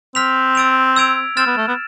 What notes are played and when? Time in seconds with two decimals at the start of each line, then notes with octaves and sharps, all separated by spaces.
0.15 C4 F6 B6 F7
0.55 E6 A6 D7 F7
0.96 E6 G#6 D7 F7
1.37 C4 F6 A6 E7
1.47 B3
1.57 A3
1.68 B3